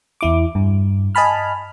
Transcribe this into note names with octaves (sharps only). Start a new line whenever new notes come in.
E2 E4 D6
G2
D#5 G#5 A5 B5 F6